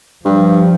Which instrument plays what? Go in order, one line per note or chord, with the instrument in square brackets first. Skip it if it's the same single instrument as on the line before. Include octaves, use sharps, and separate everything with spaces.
[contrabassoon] G2 [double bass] F3